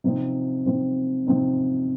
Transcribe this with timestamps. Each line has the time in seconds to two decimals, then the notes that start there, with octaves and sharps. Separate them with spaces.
0.04 C3 F3 C4 D#4
0.66 C3 F3 C4 D#4
1.26 C3 F3 C4 D#4